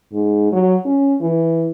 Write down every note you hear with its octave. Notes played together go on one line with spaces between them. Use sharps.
G#2
F#3
C#4
E3